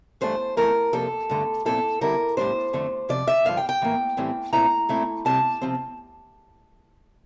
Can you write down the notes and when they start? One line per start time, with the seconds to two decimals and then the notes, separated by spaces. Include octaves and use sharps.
0.21 G2 E3 A3 D4 C5
0.57 F2 E3 A3 E4 A#4
0.93 F2 C3 F3 A#3 D4 A4
1.29 G2 D3 A3
1.65 A#2 F3 C4 E4 A4
2.01 D3 G3 C4 E4 A#4
2.37 A2 G3 D4 C5
2.73 F2 D3 A3
3.09 F2 C3 F3 D5
3.27 E5
3.45 G2 D3 F3 F5
3.57 G5
3.69 G5
3.82 A2 E3 A#3
4.17 A2 E3 G3 C4
4.53 A#2 A3 C4 E4 A#5
4.89 A#2 A3 C4 E4
5.25 C3 G3 C4 A5
5.61 C3 F3 C4